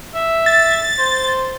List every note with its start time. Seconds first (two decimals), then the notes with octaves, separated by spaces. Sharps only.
0.15 E5
0.46 A6
0.99 C5